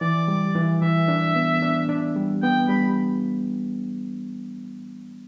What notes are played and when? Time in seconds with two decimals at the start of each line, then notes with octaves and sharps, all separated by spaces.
0.01 E3 D5
0.28 G3
0.55 E3
0.82 E3 E5
1.08 D4
1.35 B3
1.63 D4
1.89 D4
2.16 G3
2.42 B3 G5
2.69 G3 B5